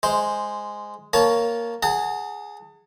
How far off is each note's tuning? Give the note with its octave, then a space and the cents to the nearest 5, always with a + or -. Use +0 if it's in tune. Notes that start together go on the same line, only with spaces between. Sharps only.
G#3 +0 C5 +0
A#3 +0 C#5 +10 A5 -20
G#4 +0 F#5 +0 A5 +40